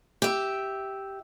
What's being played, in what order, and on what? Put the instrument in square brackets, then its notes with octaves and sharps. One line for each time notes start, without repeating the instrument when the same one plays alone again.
[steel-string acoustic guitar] G4 E5